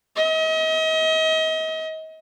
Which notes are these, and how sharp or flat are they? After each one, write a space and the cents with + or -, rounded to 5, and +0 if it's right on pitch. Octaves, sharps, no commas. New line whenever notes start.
D#5 +35